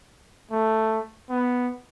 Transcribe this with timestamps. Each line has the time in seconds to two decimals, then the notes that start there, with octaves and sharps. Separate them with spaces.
0.51 A3
1.30 B3